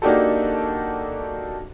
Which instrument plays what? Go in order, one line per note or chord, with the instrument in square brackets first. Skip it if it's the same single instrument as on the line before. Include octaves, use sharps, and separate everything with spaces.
[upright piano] A#3 D4 D#4 F#4 G4 A4